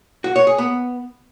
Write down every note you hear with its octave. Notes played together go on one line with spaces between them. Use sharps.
F#4
C#5
G#4
B3